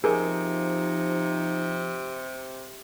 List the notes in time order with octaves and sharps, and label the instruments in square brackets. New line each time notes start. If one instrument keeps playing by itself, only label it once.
[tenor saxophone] C3 [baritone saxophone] F3 [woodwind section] D#4 [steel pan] G#4 A#4